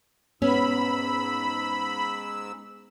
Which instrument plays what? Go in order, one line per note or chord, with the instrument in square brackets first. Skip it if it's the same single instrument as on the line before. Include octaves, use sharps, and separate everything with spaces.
[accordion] G#2 E6 [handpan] B3 [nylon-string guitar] C#4 [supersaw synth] B5